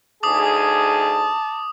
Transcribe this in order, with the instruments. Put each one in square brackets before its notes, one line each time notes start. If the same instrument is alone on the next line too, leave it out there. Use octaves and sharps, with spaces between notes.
[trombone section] D2 D#4 G#4 [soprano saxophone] A5 [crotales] D6 D#6